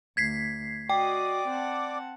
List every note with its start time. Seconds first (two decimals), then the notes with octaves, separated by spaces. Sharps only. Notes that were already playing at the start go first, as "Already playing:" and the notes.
0.17 D2 G#6 B6 C7
0.90 F#4 D5 D#5 G5 D6 D#6
1.47 C4 F#5 A5